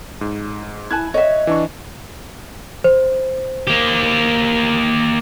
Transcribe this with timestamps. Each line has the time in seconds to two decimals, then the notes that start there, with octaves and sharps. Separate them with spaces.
0.21 G#2
0.91 E4 G#5 A5 F#6 G#6
1.14 C#5 D#5 E5
1.47 E3 D4 C#6
2.84 C5
3.67 A#3 G4